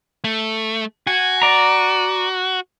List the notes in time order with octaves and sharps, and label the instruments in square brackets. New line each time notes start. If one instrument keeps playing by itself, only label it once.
[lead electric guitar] A3
[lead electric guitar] F#4 [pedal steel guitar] G#5
[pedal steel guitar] D5 A#5